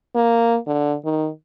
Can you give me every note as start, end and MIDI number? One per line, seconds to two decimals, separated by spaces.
0.15 0.57 58
0.67 0.95 50
1.05 1.28 51